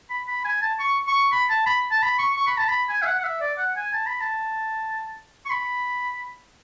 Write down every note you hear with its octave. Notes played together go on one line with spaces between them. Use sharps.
B5
B5
G#5
A5
C#6
C#6
B5
A5
B5
A5
B5
C#6
C#6
B5
A5
B5
G#5
E5
F#5
F#5
E5
D5
F#5
G#5
A5
B5
A5
C#6
B5